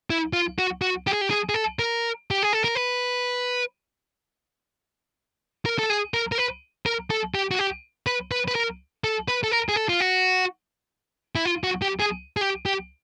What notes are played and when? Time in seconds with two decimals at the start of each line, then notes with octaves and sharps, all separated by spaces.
0.10 E4
0.33 F4
0.59 F#4
0.82 F#4
1.07 G4
1.13 G#4
1.21 G4
1.31 G#4
1.49 G#4
1.54 A4
1.79 A#4
2.31 G4
2.43 G#4
2.53 A4
2.64 A#4
2.75 B4
5.66 A#4
5.79 A4
5.90 G#4
6.14 A#4
6.32 A#4
6.38 B4
6.86 A#4
7.10 A4
7.35 G4
7.51 F#4
7.59 G4
8.07 B4
8.31 B4
8.48 B4
8.55 A#4
9.04 A4
9.28 B4
9.44 A4
9.51 A#4
9.69 G#4
9.76 A4
9.89 F4
10.00 F#4
11.35 E4
11.45 F4
11.64 F#4
11.82 G4
12.00 G#4
12.37 G#4
12.41 G4
12.66 G4